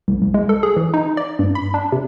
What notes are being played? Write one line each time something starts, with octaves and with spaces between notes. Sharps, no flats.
C2
C2
G#3
A4
G#4
E3
D#4
D5
G2
B5
D4
C3